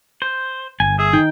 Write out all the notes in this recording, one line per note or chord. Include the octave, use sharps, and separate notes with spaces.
C5
G1 G#5
G#4 E5
D#3 D#4 G5